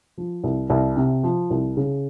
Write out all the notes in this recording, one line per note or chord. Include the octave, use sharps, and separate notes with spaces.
F3
C2
C2
C3
F3
C2
C#3